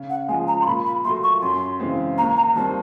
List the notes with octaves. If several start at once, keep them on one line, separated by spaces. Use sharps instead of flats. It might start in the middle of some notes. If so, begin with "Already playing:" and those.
Already playing: C#3
F#5
F3 G#3 G#5
A#5
C6
A#2 B5
B5
F#3 A3 C6
C#6
F#2 C6
C#3 E3 G#3 C4
D#2 A#5
A#5
D#3 G3 C4 A5